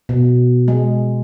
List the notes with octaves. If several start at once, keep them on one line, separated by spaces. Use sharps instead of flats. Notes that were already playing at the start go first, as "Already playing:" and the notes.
B2
G#3